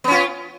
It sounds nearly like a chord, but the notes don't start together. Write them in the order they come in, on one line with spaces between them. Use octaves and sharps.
B3 C#4 F4